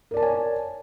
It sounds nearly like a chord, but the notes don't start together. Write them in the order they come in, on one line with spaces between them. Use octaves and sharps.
A#4 D5 A5 C#5 G#5